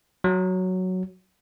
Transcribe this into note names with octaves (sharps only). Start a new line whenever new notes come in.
F#3